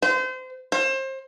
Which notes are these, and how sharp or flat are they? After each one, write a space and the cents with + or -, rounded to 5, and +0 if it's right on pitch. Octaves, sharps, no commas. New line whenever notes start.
C5 -30
C5 +30